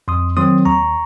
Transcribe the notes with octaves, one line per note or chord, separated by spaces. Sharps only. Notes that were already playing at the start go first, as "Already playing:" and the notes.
F2 C6 D#6
D#3 F#3 C4 C6 D#6
D#2 A#5 C#6